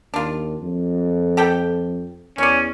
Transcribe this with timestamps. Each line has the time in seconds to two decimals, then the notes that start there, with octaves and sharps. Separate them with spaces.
0.14 D#2 D4 F4
0.61 F2
1.37 G4 A4 G5
2.38 E2 C#4 C#5 D5